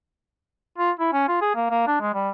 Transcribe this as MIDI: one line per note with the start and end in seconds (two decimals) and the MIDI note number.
0.78 0.91 65
0.99 1.11 64
1.13 1.27 61
1.28 1.40 65
1.41 1.54 68
1.55 1.68 58
1.70 1.83 58
1.87 1.97 62
2.00 2.13 56
2.14 2.30 55